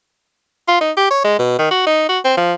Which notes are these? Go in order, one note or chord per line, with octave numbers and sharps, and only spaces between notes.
F4
D#4
G4
C#5
G#3
B2
D#3
F#4
D#4
F#4
C4
F3